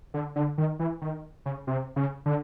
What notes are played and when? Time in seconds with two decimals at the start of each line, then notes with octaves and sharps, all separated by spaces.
0.14 D3
0.36 D3
0.58 D#3
0.79 E3
1.02 D#3
1.46 C#3
1.67 C3
1.96 C#3
2.26 D3